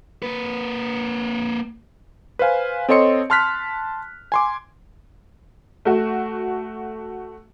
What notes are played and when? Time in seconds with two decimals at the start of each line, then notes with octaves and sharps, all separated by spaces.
0.23 A#3 B4
2.39 B4 C5 F5 G#5
2.89 C4 A4 C#5 D#5 C6 C#7
3.30 A5 C6 F6 F#6 B6
4.32 G#5 C6 D6
5.85 A3 F#4